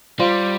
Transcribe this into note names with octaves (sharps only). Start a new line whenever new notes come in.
G3 F4 C5 F5 C6